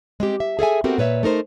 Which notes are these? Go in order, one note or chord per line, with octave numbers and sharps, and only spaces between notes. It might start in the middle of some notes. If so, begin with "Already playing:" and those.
G#3 C4 G4
E5
G#4 A4 E5 G#5
B3 C4 F#4 G4 A4 A#4
A#2 B4 C#5 E5
A3 D#4 A#4 C5